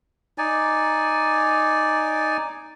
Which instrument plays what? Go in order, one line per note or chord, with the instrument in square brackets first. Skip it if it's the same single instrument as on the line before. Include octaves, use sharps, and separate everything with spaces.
[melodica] D#4 D5 G#5